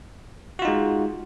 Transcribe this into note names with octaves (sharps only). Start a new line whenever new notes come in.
G#3 D#4 F4 F#4